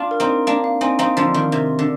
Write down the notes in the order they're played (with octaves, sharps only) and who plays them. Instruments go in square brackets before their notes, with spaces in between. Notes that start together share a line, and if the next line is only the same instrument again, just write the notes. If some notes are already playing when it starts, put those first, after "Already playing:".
Already playing: [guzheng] D4 F4 [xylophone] F5
[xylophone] A#4
[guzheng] C4 D#4
[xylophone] A#4
[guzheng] A#3 D4 [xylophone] F5
[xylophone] F5
[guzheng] C4 D#4 [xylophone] G#5
[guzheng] C4 D#4 [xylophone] F5
[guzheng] D3 F3 [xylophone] C6
[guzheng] D#3 [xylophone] A#4
[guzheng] C3 [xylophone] A#4
[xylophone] A#4
[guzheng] D3